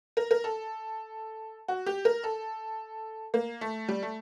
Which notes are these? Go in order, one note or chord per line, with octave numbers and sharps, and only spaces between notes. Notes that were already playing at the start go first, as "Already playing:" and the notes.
A#4
A#4
A4
F#4
G4
A#4
A4
A#3
A3
G3
A3